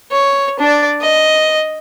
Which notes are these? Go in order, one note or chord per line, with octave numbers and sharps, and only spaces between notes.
C#5
D4 D5
D#5